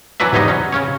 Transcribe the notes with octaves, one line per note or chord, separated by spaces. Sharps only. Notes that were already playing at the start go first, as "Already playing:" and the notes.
E3 F#3 D4 F#4 B4 E5
E2 G#2 F#3 G3 D#4 D#5
F#3 C#4
C#3 C#4 C#5